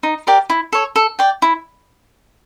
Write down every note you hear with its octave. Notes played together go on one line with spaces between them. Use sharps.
D#4
G4 A#4 D5
E4
A4 C#5
A4
D5 G5
E4